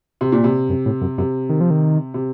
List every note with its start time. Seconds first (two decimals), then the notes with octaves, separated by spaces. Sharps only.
0.21 C3
0.32 A#2
0.44 C3
0.69 F#2
0.86 A2
1.01 F#2
1.18 F#2 C3
1.49 D#3
1.61 F3
1.70 D#3
2.14 C3